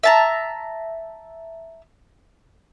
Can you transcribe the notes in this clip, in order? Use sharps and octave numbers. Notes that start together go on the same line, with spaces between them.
E5 A5 A#5